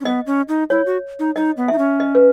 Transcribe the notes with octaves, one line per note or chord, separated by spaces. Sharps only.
C#4
B3 D#5
C#4
D#4
E4 C#5
F#4
D#4
D#4 D#5
B3
D#4 E5
C#4
D#5
B4